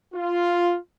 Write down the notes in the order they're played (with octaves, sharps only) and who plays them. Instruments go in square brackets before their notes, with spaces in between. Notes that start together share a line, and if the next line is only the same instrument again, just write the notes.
[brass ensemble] F4